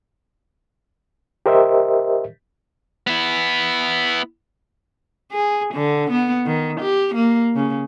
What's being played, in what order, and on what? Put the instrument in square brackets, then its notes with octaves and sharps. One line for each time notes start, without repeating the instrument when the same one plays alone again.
[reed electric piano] G4 A#4 C5 D#5 E5
[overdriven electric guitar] B3 E4
[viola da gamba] G#4
D3
B3
D#3
G4
A#3
C#3